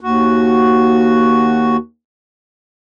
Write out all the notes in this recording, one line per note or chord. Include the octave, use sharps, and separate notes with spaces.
D#2 F#4